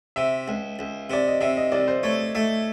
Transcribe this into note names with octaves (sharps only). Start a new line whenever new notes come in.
C3 E5
C#2
C#2
C3 D5
D#5
C3 E5
D#5
C2 D5
C5
A3 C#5
A3 E5